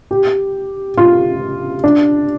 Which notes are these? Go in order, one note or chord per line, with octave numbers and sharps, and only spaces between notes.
G4
F4
D4